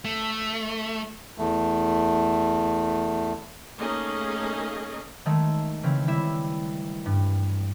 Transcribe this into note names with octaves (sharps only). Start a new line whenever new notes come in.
A3
E2 A3
A3 A#3 C#4 D#4 G#4 D#5
D#3 G#3 A3
C#3 E3 C4
G3 E4 E5 E7
G2